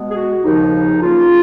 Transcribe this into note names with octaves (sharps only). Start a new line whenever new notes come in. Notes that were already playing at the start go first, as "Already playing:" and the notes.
Already playing: B2 G#3 B3
G#4
F#4
D#2 C#3 F3 D#4
C#2 C#3 F#3 A#3 F4